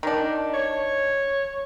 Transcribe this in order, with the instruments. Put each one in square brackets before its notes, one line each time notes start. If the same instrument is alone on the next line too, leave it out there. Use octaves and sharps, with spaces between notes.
[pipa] D#3 D4
[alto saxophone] C#5